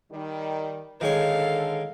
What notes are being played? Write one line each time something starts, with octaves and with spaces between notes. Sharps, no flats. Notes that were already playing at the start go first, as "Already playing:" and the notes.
D#3 G3
D3 D#3 G#3 A4 C#5 F5